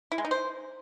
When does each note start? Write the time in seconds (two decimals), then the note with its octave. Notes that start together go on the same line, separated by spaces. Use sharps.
0.12 E4
0.18 G#3
0.25 D#4
0.31 C5